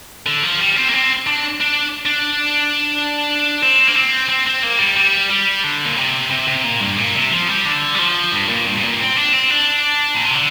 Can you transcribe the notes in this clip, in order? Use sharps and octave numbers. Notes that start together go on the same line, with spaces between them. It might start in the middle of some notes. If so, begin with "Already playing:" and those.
D3
F3
G3
C4
A#3
C4
D4
D4
D4
C4
A#3
C4
C4
C4
A#3
G3
G3
G3
D3
A#2
C3
C3
C3
A#2
G2
A#2
C3
F3
G3
D3
G3
F3
G2
A#2
G2
G2
A#2
C4
D4
C4
D4
A#2
C3
D3